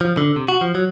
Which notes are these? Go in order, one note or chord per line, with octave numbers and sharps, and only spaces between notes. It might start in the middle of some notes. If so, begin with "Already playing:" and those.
F3
D3
C3
F#4
F3
F#3